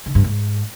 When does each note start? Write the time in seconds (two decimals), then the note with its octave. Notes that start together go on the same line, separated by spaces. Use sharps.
0.06 D3
0.15 G2
0.24 G#2